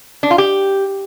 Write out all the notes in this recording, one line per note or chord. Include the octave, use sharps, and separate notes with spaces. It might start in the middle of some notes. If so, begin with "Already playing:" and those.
D4
F4
G4